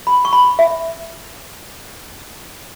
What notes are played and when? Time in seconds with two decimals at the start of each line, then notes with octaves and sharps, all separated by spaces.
0.07 B5
0.25 C#6
0.33 B5
0.59 E5